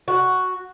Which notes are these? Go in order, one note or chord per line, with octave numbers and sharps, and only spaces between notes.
F#4